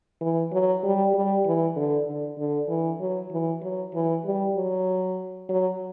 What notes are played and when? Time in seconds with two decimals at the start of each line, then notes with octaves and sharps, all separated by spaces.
0.21 E3
0.52 F#3
0.83 G3
1.14 G3
1.46 E3
1.76 D3
2.07 D3
2.38 D3
2.69 E3
3.00 F#3
3.31 E3
3.62 F#3
3.94 E3
4.25 G3
4.55 F#3
5.49 F#3